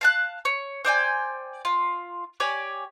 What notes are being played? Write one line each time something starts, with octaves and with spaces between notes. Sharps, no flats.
F5 A5 F#6
C#5
C5 D5 G5 G#5
F4
G4 C#5 D5 G#5